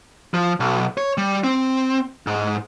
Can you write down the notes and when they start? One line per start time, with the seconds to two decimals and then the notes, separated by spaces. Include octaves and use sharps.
0.34 F3
0.60 B1
0.98 C#5
1.18 G3
1.44 C4
2.27 G#2